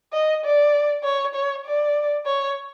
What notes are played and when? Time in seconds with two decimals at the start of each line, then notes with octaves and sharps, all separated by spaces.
0.13 D#5
0.44 D5
1.04 C#5
1.35 C#5
1.65 D5
2.26 C#5